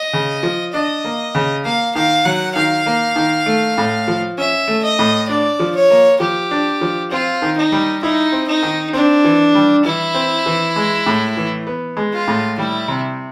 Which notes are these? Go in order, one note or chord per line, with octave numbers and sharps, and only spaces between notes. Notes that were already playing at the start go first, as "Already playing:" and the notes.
Already playing: D#5
C#3
F3
D4 D#5
A#3
C#3
A#3 F5
D#3 F5
F#3 F#5
D#3 F5
A#3
D#3
A3
A2
F3
C#4 E5
A3
D#5
A2
D4 D5
F3
C#5
A#3
F3 G4
D4
F3
C4 F4
D#3
D#4
G3
D#4 E4
C4
D#4
D#3
C4 D4
E3
G3
E3 E4
C4
E3
G#3
A2
E3
B3
G#3
F4
A2
G3 E4
C3